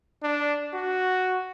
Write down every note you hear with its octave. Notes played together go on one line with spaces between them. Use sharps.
D4
F#4